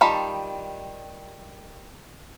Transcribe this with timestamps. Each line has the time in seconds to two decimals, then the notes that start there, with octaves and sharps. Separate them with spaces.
0.01 D#3 G3 F4 A5 B5